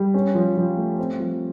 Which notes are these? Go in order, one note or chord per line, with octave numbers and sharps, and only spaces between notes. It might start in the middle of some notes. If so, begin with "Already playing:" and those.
Already playing: G3
C#4
F3
F3
A3
C4
F3